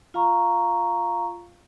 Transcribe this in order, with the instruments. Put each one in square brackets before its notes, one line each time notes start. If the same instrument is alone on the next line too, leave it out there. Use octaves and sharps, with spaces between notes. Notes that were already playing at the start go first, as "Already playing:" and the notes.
[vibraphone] F4 F5 A#5 C#6